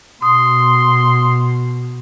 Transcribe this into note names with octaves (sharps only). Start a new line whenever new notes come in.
B2 C6 D#6